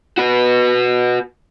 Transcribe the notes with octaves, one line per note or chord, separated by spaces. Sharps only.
F#4 B4